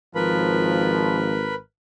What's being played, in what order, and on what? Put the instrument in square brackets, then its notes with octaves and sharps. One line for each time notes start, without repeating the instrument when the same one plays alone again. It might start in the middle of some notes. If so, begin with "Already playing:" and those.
[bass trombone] G#1 [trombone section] F3 [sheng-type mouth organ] A#4 B4 B5